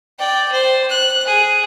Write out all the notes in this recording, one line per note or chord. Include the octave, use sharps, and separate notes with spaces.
D5 G5
C5
F#6
G#4